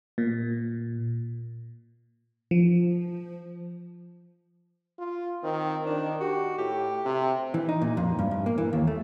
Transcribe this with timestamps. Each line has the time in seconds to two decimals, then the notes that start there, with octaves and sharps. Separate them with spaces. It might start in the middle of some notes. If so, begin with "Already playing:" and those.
0.18 A#2
2.51 F3
4.99 F4
5.44 D#3 C4
5.86 D#3 D4
6.20 F#4 G4
6.58 A2 G4
7.05 C3
7.54 E3
7.69 D#4
7.82 A#2
7.97 F2
8.19 G2
8.31 G2
8.46 A#3
8.58 E3
8.73 D#2
8.87 A3